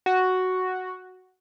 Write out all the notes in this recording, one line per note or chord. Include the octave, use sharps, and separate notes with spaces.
F#4